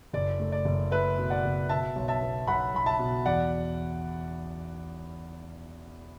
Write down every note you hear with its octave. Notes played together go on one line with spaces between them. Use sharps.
F#1 D5
A3
D5
F#1
A3 B4 E5
B2
D5 F#5
F#1
B2 E5 A5
B1
E5 A5
B3
B1 F#5 B5
B1 B5
E5 A5
B2
E2 D5 F#5